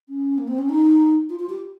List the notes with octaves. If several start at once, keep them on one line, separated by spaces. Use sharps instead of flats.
C#4
A#3
C4
C#4
D#4
F4
F4
G4